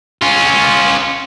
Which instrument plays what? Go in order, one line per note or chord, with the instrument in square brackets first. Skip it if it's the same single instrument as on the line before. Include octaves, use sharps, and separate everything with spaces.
[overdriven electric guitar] C#4 F4